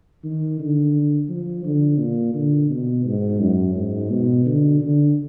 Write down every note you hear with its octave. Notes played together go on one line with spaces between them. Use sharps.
D#3
D3
F3
D3
A#2
D3
B2
G#2
F#2
G#2
B2
D3
D3